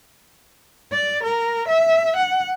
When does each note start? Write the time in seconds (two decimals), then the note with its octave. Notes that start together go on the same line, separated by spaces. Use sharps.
0.92 D5
1.23 A#4
1.68 E5
2.16 F#5